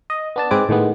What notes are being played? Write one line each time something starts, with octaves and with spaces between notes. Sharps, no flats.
D#5
B3 D4 A5
G#2 G#3 C4 B4 G#5 D6
A2 D#3 G#3 B3